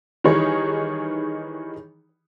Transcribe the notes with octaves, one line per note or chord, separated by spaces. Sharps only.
D#3 E3 G3 D#4 G#4 C#5